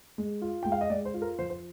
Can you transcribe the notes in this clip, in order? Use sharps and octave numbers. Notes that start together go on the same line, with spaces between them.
G#3
F4
G#3 G5
F5
D#5
G#3 D5
C5
F4
A#4
F3 C5
C5